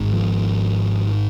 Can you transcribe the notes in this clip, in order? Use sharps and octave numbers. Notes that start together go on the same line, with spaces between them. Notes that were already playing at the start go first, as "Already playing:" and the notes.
Already playing: G#1 G#2
F3